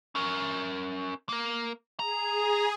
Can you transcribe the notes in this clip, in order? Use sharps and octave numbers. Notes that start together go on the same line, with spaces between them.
C#4 A#4
A#3 A#4
G#4 A#5